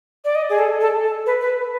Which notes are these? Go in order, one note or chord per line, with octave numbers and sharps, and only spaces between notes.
D5
D#5
G#4
A4
A4
A4
B4
B4